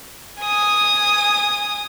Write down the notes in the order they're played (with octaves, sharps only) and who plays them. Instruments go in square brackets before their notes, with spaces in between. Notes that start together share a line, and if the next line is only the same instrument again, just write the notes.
[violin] G#5 D#6